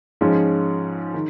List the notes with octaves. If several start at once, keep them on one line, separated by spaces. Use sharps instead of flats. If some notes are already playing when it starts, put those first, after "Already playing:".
G#2 F3 G#3 C#4
D#3